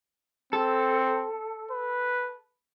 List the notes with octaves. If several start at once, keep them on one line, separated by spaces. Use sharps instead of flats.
C4 A4
B4